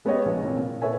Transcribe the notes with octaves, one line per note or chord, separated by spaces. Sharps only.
G#3 B3 C#4 G4 C#5 D#5
A#1
A#2 E3 C4
A#2
A4 B4 C#5 E5 G#5